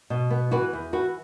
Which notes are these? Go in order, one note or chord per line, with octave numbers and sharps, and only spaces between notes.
B2
B3
E3 F#4 B4
E2
E3 F#4 B4